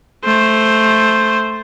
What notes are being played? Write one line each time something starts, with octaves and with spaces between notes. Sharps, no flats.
A3 C5